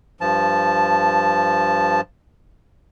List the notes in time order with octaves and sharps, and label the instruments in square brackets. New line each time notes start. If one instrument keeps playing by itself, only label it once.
[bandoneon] G2 F3 A5